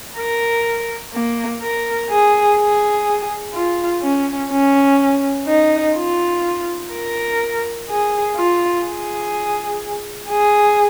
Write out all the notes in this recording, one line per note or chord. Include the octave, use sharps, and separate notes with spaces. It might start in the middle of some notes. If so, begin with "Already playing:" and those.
A#4
A#3
A#4
G#4
G#4
F4
C#4
C#4
D#4
F4
A#4
G#4
F4
G#4
G#4